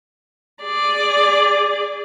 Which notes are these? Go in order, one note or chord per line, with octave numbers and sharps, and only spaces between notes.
G#4 D5